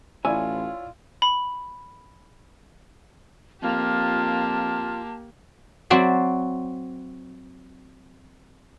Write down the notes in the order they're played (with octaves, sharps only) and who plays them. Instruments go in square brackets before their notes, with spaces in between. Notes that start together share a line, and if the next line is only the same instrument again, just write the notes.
[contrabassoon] A1 [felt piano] E4 D5 E6 [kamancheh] F4 [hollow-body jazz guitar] C#5 G#5
[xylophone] B5
[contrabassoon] F2 [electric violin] A#3 G4 [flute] F4 [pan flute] A5
[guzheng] F#3 C4 F#4 D5 E5